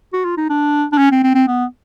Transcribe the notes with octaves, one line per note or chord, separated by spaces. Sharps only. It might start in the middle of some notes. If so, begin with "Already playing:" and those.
F#4
F4
D#4
D4
D4
C#4
C4
C4
C4
B3